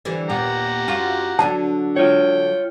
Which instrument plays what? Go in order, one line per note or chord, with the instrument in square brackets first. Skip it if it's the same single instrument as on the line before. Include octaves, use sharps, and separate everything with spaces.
[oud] D3 E3 G3
[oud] D#2 A#2 B3 [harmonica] G4 F#5 A#5
[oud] F#2 F4 F#4
[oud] D3 F#3 D4 [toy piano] A5
[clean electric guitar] F4 C#5 [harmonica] G5